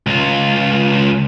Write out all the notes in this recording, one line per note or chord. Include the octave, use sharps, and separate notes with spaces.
C#2 F4